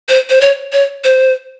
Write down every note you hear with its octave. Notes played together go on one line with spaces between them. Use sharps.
C5
C5
C#5
C#5
C5